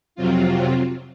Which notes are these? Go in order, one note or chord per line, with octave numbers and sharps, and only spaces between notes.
F2 C3 F#3 C4 F4